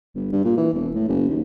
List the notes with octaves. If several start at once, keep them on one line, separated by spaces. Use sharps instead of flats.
G1
G2
A#2
E3
E1
A2
F#1
D#2